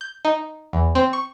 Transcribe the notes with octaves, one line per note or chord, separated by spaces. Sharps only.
G6
D#4
E2
C4
C#6